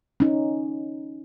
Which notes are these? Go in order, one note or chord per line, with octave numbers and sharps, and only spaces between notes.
C#4 D#4